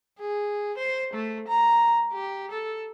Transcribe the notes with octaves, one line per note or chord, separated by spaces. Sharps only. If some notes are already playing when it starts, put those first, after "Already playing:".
G#4
C5
A3
A#5
G4
A4